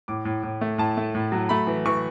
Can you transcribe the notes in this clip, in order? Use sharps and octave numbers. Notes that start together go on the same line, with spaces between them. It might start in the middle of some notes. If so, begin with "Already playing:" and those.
A2 D6
A2
A2
A3
A2 A5
A3
A2
F#3
A3 B5
E3
E3 C#6